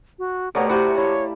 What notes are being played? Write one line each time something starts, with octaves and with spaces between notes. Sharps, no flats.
F#4
D2 B2 G4 A#4 C#5 D5
C3 A3 E4 F#4 C5 F#5
E4 C#5 F5 A5